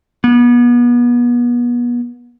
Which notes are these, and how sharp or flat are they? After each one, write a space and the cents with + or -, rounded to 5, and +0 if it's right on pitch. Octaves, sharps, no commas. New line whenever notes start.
B3 -35